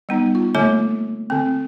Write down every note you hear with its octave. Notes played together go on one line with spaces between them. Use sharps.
G3 B3 D#4
F4
D3 A3 A#3 C#5 D6
D3 C4